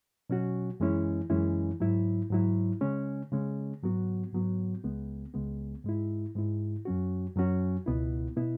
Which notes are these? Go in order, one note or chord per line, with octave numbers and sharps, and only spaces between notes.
B2 F#3 C#4 F#4
F#2 E3 G#3 C#4 E4
F#2 E3 G#3 C#4 E4
G#2 F#3 E4
G#2 F#3 E4
C#3 G#3 C#4
C#3 G#3 C#4
G#2 F#3 B3 F#4
G#2 F#3 B3 F#4
C#2 C#3 G#3 B3
C#2 C#3 G#3 B3
G#2 G#3 E4
G#2 G#3 E4
F#2 F#3 C#4 F#4
F#2 F#3 C#4 F#4
C#2 B2 B3 E4
B2 B3 E4